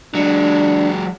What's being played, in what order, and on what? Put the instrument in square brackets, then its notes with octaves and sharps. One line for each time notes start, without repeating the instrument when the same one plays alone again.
[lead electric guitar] F#3 G#3 [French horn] D4